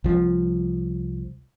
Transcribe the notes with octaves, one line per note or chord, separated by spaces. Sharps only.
C2 F3